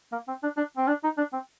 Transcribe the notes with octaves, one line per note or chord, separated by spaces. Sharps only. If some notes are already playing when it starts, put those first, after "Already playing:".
A#3
C4
D4
D4
C4
D4
D#4
D4
C4